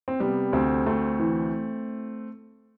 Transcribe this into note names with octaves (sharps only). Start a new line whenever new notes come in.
C4
C3 G3 B3
D2 A3 C4
D2 A3 C4
E3